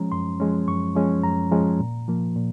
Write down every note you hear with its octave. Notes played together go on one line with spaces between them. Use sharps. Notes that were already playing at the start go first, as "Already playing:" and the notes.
Already playing: F3 G#3 C#4 A#5
F#2 C6
F3 G#3 C#4
F#2 C#6
F3 G#3 C#4
F#2 A#5
F3 G#3 C#4
A#2
F3 A#3
A#2